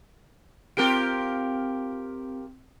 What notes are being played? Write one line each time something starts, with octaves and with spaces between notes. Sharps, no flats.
C4 F4 G4 A#4 D7